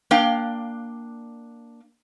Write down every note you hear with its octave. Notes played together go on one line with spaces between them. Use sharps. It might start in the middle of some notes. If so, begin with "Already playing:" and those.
A#3 D4 F5 G5